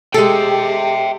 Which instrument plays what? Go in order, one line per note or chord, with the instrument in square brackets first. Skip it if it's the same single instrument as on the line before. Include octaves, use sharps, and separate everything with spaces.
[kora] G#3 A4 [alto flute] G4 [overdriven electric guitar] E5 G5